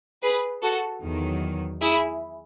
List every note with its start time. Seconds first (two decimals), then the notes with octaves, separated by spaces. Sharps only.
0.22 G#4 B4
0.62 F#4 A4
1.02 E2 D#3 F#3
1.81 E4 G#4